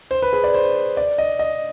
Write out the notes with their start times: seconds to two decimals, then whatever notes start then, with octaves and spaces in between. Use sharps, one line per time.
0.11 C5
0.22 B4
0.33 G#4
0.44 D5
0.54 C5
0.97 D5
1.18 D#5
1.39 D#5